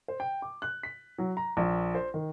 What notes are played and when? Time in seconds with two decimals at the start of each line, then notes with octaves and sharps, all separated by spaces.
0.08 C5
0.20 G5
0.42 D6
0.62 F#6
0.83 B6
1.18 F#3
1.37 A#5
1.57 A#1
1.95 C5
2.14 D#3